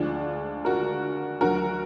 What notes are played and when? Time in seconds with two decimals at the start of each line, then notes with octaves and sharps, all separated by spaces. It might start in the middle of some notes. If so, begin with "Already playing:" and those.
Already playing: D2 D3 F3 G#3 D4 F4
0.65 F#4 A#4
1.41 D2 D3 F#3 F#4 A#4